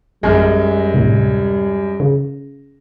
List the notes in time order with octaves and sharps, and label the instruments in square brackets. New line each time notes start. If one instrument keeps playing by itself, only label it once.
[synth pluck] A#1 F6 [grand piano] F#2 G#3 [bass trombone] G3
[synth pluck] D2 A2 C3
C#3